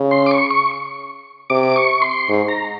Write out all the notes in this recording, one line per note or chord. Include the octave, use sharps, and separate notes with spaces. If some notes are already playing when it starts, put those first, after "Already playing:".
Already playing: C#3
C6
D6
C#6
C#6
C3 D6
C#6
C6
G#2
A#5